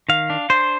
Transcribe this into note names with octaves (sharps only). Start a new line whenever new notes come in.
D#3 F5
D4
D4 C5